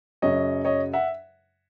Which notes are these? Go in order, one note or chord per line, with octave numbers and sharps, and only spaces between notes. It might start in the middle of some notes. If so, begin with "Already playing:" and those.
F#2 C#3 F#3 C#5 D#5
C#5 D#5
E5 F#5